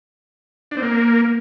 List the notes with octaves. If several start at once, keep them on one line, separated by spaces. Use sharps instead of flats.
D4
C4
A#3